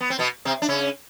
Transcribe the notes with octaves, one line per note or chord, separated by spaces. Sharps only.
B3
C4
B2 B3
C3 C4
D4
C#3 C#4